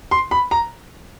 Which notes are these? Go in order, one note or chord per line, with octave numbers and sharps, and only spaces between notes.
C6
B5
A#5